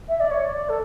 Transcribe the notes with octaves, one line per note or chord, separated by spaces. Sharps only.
E5
D5
C#5
D5
A4